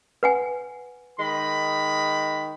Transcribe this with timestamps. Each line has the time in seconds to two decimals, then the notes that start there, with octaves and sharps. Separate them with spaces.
0.23 B4 F#5 G#5
1.20 D#3 G#3 B5